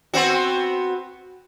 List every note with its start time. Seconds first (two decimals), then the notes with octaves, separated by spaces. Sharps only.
0.14 B3 C4 F#4